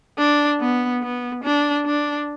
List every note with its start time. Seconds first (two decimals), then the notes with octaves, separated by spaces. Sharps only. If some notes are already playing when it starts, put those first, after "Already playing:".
0.18 D4
0.60 B3
1.02 B3
1.44 D4
1.86 D4